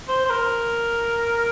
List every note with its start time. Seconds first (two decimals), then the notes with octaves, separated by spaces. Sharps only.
0.08 C5
0.26 C5
0.30 A#4